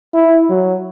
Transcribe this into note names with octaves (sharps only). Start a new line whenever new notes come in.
E4
F#3